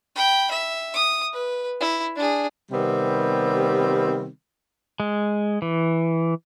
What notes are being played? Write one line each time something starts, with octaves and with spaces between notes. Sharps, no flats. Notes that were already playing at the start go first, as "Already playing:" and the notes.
G5 B5
E5
D#6
B4
E4
D4 G#4
C3 D#3 G3 B3 C4
G#3
E3